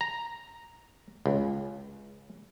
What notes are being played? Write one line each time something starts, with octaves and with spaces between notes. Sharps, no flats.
A#5
C#2